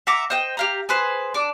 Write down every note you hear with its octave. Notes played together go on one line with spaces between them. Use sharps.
E5 F#5 A#5 D6
C5 D#5 G5
G4 F5 A#5
G#4 B4 C5
D4 D6